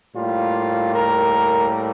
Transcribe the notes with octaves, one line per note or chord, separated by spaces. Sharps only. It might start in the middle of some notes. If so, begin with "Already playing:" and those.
A2 G3 A#3 F4
A#4